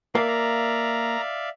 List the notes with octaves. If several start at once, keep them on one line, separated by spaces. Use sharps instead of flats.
A#3 D5 E5 F5
A#5